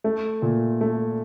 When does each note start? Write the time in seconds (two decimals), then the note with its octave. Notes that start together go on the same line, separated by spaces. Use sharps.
0.04 A3
0.42 A#2
0.81 A3